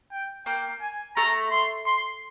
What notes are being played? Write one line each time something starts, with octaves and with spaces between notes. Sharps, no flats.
G5
A#3 G5
G#5
A3 A#5
C6
C6